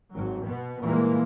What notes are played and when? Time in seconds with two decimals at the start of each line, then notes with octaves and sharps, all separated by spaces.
0.13 G#1 F#3
0.44 B2 B3
0.82 A#2 E3 G3 G#3 A#3